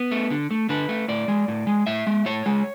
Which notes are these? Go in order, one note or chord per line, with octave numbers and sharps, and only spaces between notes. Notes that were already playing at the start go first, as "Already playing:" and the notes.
Already playing: B3
A3
D3
A3
D3 B4
A3
A2 D5
G#3
A2
G#3
A2 E5
G#3
A2 C#5
G#3